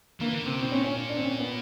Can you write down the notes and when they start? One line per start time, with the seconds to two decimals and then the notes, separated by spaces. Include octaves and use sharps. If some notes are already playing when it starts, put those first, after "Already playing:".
0.20 E3 A#3
0.33 D3
0.46 C3 C4
0.59 B2 C4
0.72 A#2 C#4
0.84 C#4
0.97 C#4
1.09 D4
1.17 C4
1.22 C#4
1.39 B3